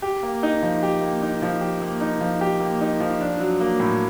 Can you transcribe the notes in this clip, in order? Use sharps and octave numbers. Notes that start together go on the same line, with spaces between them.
G4
A#3
D#4
F3
G4
A#3
D#4
F3
G4
A#3
D#4
F3
G4
A#3
D#4
F3
D4
F#3
A#3
A2